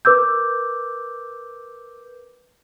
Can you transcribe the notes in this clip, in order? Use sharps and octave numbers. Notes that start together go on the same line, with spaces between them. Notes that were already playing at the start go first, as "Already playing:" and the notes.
A#4 B4 D6 E6 G6